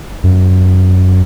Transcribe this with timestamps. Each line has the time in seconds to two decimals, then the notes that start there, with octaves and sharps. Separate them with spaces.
0.24 F#2